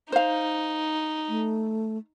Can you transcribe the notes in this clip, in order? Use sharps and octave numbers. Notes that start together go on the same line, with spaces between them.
D#4 C5 F5
A3